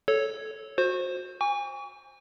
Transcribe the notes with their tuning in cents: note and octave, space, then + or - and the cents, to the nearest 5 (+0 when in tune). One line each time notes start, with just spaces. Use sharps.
A4 -10 C#5 +0
F#4 -25 C5 +15
G#5 -30 C#6 +40